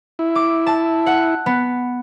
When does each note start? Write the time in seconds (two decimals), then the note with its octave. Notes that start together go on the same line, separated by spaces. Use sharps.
0.19 E4
0.35 D6
0.67 A5
1.06 F#5
1.46 B3